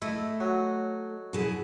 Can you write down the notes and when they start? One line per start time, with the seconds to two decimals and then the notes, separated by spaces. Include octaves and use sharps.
0.02 A3 E4 D#5
0.40 F#3
1.33 B2 E4 G#4